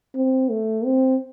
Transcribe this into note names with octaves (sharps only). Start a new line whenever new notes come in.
C4
A3
C4